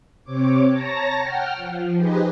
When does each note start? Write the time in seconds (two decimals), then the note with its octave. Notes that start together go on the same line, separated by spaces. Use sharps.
0.24 C3 C4 C#5 D6
0.69 C#5 A5 A#5 A#6
1.19 F#5 G5 F6
1.55 F3
1.96 D#4 G4 G#4 B4 C5 D#5